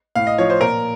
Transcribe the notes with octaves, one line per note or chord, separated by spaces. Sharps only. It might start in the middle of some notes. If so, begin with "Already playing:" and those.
A2 F5
D#5
F3 C#5
C5
A#2 A#4